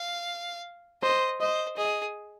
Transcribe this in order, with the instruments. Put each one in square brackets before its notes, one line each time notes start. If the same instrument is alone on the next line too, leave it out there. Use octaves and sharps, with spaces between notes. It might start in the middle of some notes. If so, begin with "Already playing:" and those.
Already playing: [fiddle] F5
[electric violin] C5 [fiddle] D#5
[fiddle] C5 [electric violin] D#5
[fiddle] G#4 [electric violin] D#5